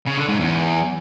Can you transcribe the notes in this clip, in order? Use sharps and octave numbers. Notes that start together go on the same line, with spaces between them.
C#3
D3
G#2
E2